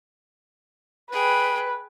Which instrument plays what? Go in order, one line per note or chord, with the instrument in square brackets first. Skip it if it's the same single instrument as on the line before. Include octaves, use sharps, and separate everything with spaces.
[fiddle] G#4 G5 [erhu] B4